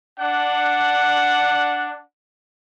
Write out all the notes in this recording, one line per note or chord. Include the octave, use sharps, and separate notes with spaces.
D4 F#5